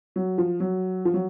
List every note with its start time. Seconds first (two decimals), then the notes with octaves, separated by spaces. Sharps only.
0.16 F#3
0.38 F3
0.60 F#3
1.05 F3
1.14 F#3